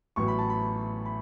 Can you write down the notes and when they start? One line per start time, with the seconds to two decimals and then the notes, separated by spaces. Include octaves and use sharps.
0.16 A1 A2 F#3 B3 C#6
0.28 B5
0.38 A5
0.49 B5
1.05 B5